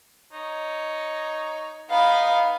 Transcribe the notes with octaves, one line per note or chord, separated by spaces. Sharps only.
D#4 C#5
B3 D#4 F5 B5